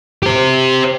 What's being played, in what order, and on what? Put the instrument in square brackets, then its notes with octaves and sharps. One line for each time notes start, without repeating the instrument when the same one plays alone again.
[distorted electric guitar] G4 C5